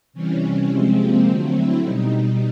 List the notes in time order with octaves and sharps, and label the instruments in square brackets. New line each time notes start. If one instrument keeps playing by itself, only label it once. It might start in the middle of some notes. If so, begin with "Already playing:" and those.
[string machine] C3 E3 G3 C#4
C3 F3 G#3 C4
A#3
D3 F#3 A3 C4
E4
B2 G3 D#4